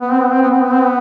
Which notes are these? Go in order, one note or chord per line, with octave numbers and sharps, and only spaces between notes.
B3
C4
B3
C4
B3
C4
B3
C4
B3